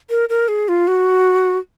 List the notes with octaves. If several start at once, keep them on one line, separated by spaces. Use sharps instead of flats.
A#4
A#4
G#4
F4
F#4